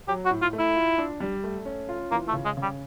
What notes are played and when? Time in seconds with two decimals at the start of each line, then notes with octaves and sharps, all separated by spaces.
0.08 F#3 G4
0.25 F#4
0.31 A2
0.42 F4
0.53 A3
0.59 E4
0.75 F4
0.98 D4
1.20 G3
1.44 A3
1.65 C#4
1.89 F4
2.11 E3 A#3
2.28 A3
2.33 C#3
2.45 G#3
2.57 C#3
2.62 G3